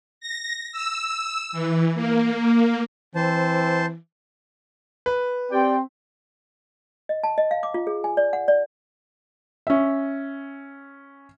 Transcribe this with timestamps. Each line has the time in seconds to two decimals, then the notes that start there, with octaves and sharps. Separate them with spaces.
0.21 A#6
0.72 E6
1.52 E3
1.95 A#3
3.15 E3 C4 C5 A5
5.06 B4
5.51 C4 G4 D5 G5
7.09 D#5
7.24 A5
7.38 D#5
7.51 F5
7.63 D6
7.74 F4
7.87 G#4
8.04 G#5
8.17 D5
8.33 F#5
8.48 D5
9.67 C#4 E5